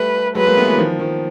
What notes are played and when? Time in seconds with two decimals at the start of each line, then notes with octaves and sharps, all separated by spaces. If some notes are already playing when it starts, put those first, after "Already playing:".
Already playing: G3 A3 B4
0.35 F#3 G#3 B4
0.47 G#3 A#3
0.56 A3 B3
0.68 E3 F#3
0.78 D#3 F3
0.99 D#3 F3